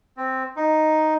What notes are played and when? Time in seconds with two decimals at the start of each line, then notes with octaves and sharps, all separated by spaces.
0.17 C4
0.56 D#4